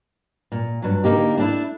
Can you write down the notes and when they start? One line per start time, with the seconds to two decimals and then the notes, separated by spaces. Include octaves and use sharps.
0.52 A#2
0.82 G2 F#3
1.04 D3 A#3 D#4 G4
1.37 A3 D4 E4